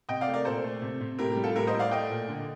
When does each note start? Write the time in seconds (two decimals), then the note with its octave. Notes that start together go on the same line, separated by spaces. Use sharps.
0.09 C3 D#5 G5
0.21 D5 F5
0.27 A3
0.34 A#4 D5
0.45 A#2 A4 C5
0.64 A3
0.82 C3
1.01 C3
1.19 A2 G4 A#4
1.32 G3 G4
1.44 F4 A4
1.55 A2 G4 A#4
1.67 C5 D#5
1.73 A2
1.79 D5 F5
1.91 A3 D#5 G5
2.10 A#2
2.29 D3